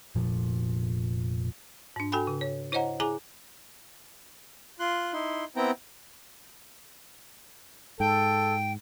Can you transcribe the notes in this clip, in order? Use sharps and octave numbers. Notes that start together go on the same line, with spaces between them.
F1 A#2 F3
G#2 D4
F#4 A4 G5 G#5 B5
C#3
C#5
E4 C5 C#5 D#5 F#5 A#5
E4 G#4 G#5 A#5 D6
F4 C6 F#6
D#4 E4 C6
B3 C4 E4 G5 A#5
G#2 A4 G5